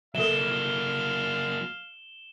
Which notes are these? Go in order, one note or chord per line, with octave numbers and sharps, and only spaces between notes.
F#3 A#3 A4 E5 F5 E7 G7